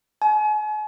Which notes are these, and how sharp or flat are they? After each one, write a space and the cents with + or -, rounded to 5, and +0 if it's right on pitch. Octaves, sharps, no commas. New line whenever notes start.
G#5 +40